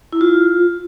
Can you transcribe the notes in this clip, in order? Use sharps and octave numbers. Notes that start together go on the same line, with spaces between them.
E4
F4